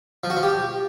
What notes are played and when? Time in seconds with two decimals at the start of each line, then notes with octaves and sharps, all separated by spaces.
0.24 F3
0.30 F#4
0.37 F3
0.43 G4